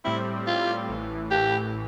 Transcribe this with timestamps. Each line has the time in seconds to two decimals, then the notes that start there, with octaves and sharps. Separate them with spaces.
0.05 A2 G3 C4 E4
0.47 F4
0.89 A1 A2 E3
1.31 G4